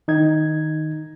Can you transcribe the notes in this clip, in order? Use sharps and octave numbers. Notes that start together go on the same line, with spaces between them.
D#3 D#4 G#6